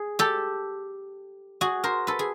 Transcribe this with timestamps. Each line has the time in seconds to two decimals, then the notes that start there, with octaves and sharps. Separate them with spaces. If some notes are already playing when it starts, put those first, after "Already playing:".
Already playing: G#4
0.19 G4 A4
1.61 F#4 G#4
1.84 A#4 C5
2.07 A4 B4
2.19 G#4